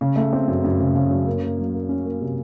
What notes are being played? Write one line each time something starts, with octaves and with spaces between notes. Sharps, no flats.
C#3
A3
C4
F#2
F#2
C#3
C#3
F#2
A#3
A#3
F#3
A#3
C#4
A#3
C3